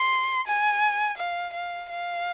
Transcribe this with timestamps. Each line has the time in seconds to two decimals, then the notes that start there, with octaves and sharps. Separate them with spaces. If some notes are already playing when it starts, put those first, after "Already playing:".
Already playing: C6
0.47 G#5
1.18 F5
1.53 F5
1.90 F5